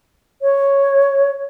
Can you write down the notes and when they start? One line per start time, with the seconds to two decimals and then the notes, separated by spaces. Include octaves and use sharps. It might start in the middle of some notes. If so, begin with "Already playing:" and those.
0.42 C#5